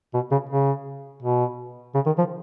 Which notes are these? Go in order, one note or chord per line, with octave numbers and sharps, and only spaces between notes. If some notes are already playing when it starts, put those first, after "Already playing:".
B2
C#3
C#3
B2
C#3
D#3
F3